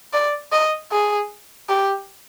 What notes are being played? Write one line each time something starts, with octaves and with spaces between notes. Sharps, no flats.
D5
D#5
G#4
G4